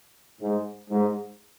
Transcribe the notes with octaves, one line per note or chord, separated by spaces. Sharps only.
G#2
G#2